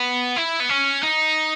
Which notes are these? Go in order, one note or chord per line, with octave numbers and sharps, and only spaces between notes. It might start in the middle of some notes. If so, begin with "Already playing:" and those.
Already playing: B3
E4
B3
C#4
D#4